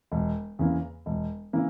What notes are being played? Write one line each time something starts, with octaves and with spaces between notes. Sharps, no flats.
E1
E2 C#3 E3 A#3
E1
C#3 E3 A#3